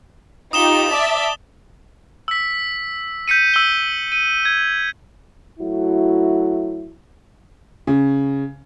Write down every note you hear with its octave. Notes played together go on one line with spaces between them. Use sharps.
D#4 F4 G4 D#6 E7 G7
D5 E5 A5
E6 B6
G6 B6 C#7 D#7
E6 G7
D#7
G#6
F#3 A3 E4 F#4
C#3